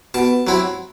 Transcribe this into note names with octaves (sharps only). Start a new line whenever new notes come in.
B2 A5
F#3 C4 E4